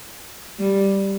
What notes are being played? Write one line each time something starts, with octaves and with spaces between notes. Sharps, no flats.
G3